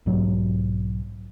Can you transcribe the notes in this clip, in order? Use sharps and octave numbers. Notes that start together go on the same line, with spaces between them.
B1 G#2 F#3